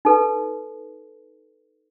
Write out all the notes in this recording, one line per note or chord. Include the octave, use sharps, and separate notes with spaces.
D#4 A4 B4